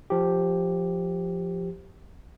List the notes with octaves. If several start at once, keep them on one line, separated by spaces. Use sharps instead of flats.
F3 G4